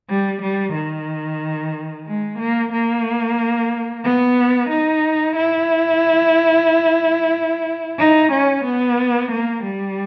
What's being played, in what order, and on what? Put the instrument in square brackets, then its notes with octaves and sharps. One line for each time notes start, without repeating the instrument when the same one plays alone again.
[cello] G3
G3
D#3
G#3
A#3
A#3
B3
D#4
E4
D#4
C#4
B3
A#3
G3